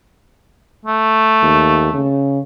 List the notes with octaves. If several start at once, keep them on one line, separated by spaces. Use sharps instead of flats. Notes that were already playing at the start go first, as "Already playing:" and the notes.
A3
D#2
C#3